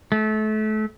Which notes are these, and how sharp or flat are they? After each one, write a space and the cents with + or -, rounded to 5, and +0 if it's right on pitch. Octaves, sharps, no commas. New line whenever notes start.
A3 -30